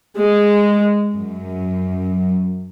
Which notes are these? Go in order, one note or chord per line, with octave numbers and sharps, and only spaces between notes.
G#3
F#2